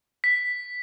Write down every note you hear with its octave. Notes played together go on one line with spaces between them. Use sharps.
B6